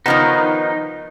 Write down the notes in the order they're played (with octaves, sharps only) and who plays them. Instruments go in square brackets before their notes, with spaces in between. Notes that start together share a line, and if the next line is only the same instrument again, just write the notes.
[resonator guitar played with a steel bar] D#3 F3 B3 [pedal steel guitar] D#4